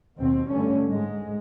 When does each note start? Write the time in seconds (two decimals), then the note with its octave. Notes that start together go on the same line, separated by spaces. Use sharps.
0.17 D#2 B2 C4
0.50 G2 D3 A3 C#4
0.86 G#2 G#3